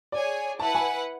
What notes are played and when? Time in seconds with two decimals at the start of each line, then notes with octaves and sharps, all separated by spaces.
0.12 G#4 C#5 D5 G#5
0.59 E4 B4 F#5 A5
0.75 G#5